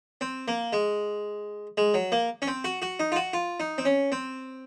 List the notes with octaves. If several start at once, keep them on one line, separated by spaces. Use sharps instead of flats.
C4
A#3
G#3
G#3
F#3
A#3
C#4
C4
F#4
F#4
D#4
F4
F#4
F4
D#4
C4
C#4
C4